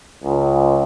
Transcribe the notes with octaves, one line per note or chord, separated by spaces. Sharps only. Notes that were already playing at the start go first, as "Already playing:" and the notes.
C#2